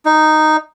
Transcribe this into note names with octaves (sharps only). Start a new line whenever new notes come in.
D#4